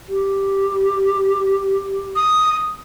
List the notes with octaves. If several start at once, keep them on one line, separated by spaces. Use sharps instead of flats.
G4
D#6